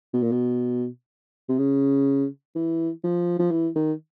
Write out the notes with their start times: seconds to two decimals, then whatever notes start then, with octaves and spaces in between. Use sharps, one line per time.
0.14 B2
0.22 A#2
0.32 B2
1.49 C3
1.58 C#3
2.56 E3
3.04 F3
3.39 F3
3.51 E3
3.76 D#3